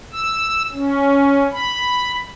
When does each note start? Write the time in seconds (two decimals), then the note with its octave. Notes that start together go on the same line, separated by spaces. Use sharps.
0.13 E6
0.72 C#4
1.52 B5